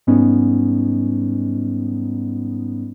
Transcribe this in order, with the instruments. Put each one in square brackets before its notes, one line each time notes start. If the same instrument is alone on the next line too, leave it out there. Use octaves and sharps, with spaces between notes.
[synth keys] G#2 G3 B3 C#4 D#4